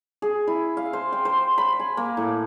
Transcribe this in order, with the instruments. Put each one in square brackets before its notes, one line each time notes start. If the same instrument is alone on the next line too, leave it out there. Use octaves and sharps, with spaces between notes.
[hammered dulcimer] G#4
E4
F5
C5
G5
C5
B5
G#5
A#3
A2